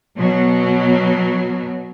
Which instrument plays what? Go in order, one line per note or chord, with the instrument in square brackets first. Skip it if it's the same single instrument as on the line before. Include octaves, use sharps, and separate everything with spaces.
[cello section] B2 F#3